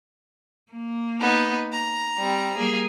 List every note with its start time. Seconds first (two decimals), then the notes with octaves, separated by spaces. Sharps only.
0.72 A#3
1.20 B3 D#4
1.72 A#5
2.17 G3 C4
2.56 G3 A#3 G#4